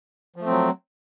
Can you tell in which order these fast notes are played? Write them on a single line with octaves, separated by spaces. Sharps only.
F3 A3 C4 F#3